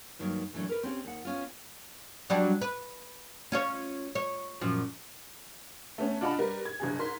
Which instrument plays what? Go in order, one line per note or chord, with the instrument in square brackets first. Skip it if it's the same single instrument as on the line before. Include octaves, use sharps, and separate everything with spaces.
[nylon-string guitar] G2 D#3 F#3 A#3
A#2 E3 F#3 A3 D4
A#4 B4
C4 C#4 F#4 G4
D#2 F#5
B3 C#4 F4
[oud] F#3 G3 D4
B4
C#4 F4 C#5
C#5
F#2 A#2 F3
[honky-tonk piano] A3 B3 C#4
D4 F4 D#5 F#5 A5 B5
G3 A#4 B4
G#6
F#1 G2 G#4
G#2 A#4 C6 B6